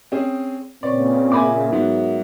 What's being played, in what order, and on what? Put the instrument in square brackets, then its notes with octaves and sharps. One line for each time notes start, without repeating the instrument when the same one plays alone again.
[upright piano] C4 C#4 G#4
[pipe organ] A#2 C#3 [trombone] C4 [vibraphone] B4 C#5 C#6 [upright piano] D5
[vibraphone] G#4 A#4 E5 [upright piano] G#5 B5 D6
[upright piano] G#2 B3 [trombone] F#3